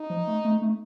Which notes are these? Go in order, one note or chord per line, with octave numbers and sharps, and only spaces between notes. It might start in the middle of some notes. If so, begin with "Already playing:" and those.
Already playing: D#4
F3
A3
A3
A3